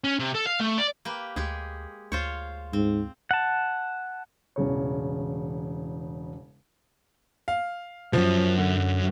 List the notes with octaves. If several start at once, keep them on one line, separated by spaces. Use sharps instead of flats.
C#4
C3
A4
F5
A3
D5
A#3 G4 B4
D2 G#3 G4 G#4
D2 F4 C5 C#5
G#2 C4
F#5 A5
E1 A1 C#3 C#5
F5
C2 F#2 F3
D3